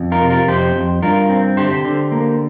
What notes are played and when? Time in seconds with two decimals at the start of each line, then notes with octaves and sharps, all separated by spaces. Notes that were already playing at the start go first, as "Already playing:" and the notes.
Already playing: F2
0.12 F4 A#4
0.21 C3
0.30 F4 A#4
0.48 F2 G4 C5
0.75 F2
1.02 G2 F4 A#4
1.29 C4
1.57 D3 G4 C5
1.85 D3
2.12 A#3